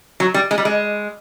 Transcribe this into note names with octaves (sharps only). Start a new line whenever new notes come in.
F#3
G3
G#3
G3
G#3